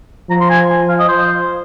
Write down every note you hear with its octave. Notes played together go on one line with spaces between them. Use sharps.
F3 A#5
C6
G#5
F5
D#5
C5